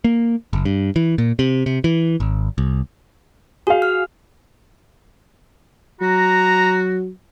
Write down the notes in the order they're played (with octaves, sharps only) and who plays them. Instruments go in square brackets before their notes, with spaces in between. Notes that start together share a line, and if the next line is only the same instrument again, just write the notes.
[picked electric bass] A#3
F#1
G2
E3
A#2
C3
C3
E3
G#1
C2
[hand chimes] F#4 [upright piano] G#4 F5
[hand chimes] F6
[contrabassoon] F#3 [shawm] F#4 [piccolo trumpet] A#5